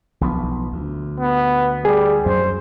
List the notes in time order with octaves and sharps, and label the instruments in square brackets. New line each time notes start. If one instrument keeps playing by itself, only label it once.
[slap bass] B1 F3 B3
D2
[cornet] B3
[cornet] G3 [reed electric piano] G#4
[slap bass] F#2 F#3 [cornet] C5